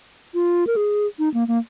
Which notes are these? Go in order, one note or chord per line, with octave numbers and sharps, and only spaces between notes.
F4
A#4
G#4
D#4
A#3
A#3